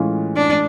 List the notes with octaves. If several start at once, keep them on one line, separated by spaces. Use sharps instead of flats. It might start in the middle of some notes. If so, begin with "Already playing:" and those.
Already playing: A2 E3 G#3 C#4 F4
D4